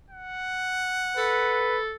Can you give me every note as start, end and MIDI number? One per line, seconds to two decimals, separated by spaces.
0.10 1.75 78
1.17 1.96 69
1.17 1.80 71